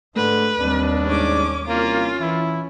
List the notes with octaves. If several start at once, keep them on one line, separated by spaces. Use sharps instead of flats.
G#2 D3 A3 B4
D#2 G3 C4 D4
G#2 C#4 D6
C2 A#3 C#4 F4
E3 E4